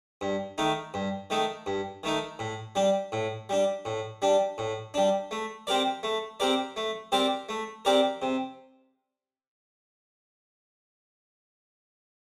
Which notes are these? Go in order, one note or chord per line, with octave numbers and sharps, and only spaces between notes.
G2
D#3 A3 D#4
G2
D#3 A3 D#4
G2
D#3 A3 D#4
A2
G3 D4
A2
G3 D4
A2
G3 D4
A2
G3 D4
A3
C4 G4 A#4 D5
A3
C4 G4 A#4 D5
A3
C4 G4 A#4 D5
A3
C4 G4 A#4 D5
C3